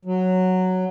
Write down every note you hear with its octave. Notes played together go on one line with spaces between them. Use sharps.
F#3